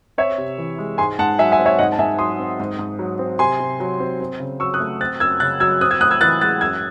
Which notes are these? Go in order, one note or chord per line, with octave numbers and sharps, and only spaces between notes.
C4 C#5 E5
C3
E3
G#3
G#2 G#5 C6
G#2 F#5 A5
F#3 E5 G#5
E5 G#5
C4
C#5 E5
G#2 D#5 F#5
A5
G#2 E5 G#5
F#3 C6 D#6
C4
G#2
G#2
F#3
C4
C3 G#5 C6
C3
F#3
C4
C4
C#3
F#3 C#6 E6
D#6 F#6
A3
C4 F#6 A6
F#2 E6 G#6
C#3 F#6 A6
F#3 E6 G#6
C4 D#6 F#6
E6 G#6
A2 D#6 F#6
E6 G#6
E3 F#6 A6
G#3 F#6 A6
F#2 E6 G#6